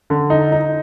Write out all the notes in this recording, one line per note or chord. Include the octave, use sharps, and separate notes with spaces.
D3
D#4
D#4